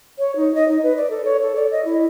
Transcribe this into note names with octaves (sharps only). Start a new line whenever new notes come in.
C#5
D#4
D#5
D#4
B4
D5
A4
C#5
A4
D5
D#5
E4